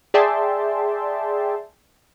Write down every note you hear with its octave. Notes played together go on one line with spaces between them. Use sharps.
G#4 D5 E5 G5 A5 C6